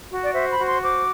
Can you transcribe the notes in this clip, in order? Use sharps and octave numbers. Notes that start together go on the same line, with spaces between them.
F#4
D5
C5 E5
B5
F#4
C6
C5 D6